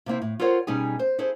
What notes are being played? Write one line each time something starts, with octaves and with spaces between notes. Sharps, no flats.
C3 A#3 C4 E4
A2
F4 A4 A#4 C5 C#5 F#5
B2 G3 C#4 D#4 G#4 G#5
C5
E4 G#4 A4 C5